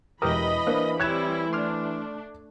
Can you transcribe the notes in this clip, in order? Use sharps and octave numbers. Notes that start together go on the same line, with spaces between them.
E1 E3 G4 A#4 B4 D#5 B5 D#6
A#3 D4 B4 C5 F5
G3 C4 E4 C#5 F#6 G#6 E7
A3 D4 C6 D6 F6